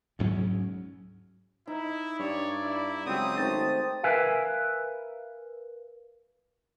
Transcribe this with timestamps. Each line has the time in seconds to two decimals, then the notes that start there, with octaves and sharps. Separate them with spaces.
0.19 D2 G#2 F#3 C#4
1.67 D#4 E4
2.20 G2 C#5 D5
2.62 E4
3.06 C#2 F#3 C4 G4 D#6
3.38 G#1 A3 C4 D#4 A5
4.03 A#4 B4 E5 F5 G#5